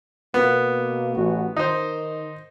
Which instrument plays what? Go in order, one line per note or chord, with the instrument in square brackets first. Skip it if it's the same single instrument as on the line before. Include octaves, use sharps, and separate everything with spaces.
[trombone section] B2 A#3 [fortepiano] B3
[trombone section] A1 F#4
[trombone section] D#3 [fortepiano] D#4 C5